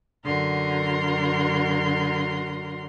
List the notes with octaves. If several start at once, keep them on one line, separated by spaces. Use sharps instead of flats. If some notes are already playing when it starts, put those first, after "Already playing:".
F#2 D3 F#4 A#4 C6